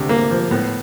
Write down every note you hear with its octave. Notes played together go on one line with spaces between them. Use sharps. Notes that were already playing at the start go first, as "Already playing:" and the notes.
Already playing: D2 C3
A#3
F3
A2 B3